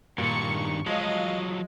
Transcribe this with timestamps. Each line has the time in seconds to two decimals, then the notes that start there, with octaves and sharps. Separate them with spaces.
0.18 G2 A#2 D#3 C#6
0.86 F3 F#3 G#3 D#5 F5